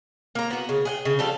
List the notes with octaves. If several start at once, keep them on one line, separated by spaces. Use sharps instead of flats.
A#3 A#5
B3 F#4
C#3
G#4 F#5 G5
C#3
F3 G3 A4